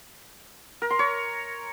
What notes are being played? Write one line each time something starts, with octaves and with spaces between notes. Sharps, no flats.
A#4
C6
C#5